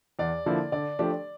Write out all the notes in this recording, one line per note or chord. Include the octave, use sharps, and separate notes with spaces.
E2 D5
D3 F3 A#3 E4
D3 D5
F3 A3 D4 G4